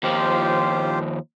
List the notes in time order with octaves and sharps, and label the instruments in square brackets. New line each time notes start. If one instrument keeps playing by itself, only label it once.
[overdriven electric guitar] D#2 F3 [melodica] F4 G4 C5